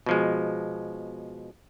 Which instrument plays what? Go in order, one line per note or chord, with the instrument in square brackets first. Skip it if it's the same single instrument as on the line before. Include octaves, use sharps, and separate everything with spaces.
[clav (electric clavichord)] B2 F3 G#3